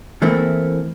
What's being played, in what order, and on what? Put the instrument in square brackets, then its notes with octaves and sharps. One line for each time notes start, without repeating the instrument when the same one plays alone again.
[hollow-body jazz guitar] E3 A3 A#3 C4 E4